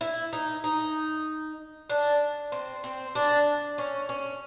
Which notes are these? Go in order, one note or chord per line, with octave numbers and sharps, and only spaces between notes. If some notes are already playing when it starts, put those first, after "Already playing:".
E4
D#4
D#4
D4
C4
C4
D4
C#4
C#4